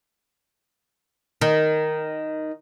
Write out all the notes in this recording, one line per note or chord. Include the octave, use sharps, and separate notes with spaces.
D#3